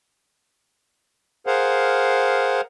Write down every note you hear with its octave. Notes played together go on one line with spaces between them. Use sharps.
G#4 A#4 C5 F5 F#5